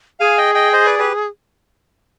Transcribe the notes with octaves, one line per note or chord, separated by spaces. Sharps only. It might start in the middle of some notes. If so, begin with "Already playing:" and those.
G#4 F5 G#5
D#5 G5
D#5 G5
C5 D#5
B4 D5
G4 B4